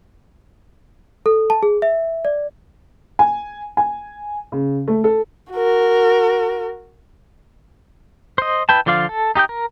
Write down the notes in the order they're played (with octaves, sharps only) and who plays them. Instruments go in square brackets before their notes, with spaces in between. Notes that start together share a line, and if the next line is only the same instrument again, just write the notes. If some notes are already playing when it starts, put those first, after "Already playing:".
[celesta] A4
A5
G#4
E5
D5
[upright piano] G#5
G#5
C#3
A3
A4
[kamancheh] F#4 A#4
[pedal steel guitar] C5 D#5
E4 B4 G5 A5
D3 F3 F4 D5 F5
A4
D#4 G4 D#5 G5
A#4